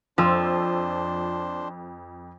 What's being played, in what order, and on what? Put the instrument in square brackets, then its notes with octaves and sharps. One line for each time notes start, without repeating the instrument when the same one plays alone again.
[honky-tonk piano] F2 E6 [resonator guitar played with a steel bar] F3 [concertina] D4 C5